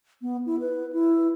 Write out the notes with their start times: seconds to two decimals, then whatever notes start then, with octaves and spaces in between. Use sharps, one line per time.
0.22 B3
0.46 E4
0.60 B4
0.92 E4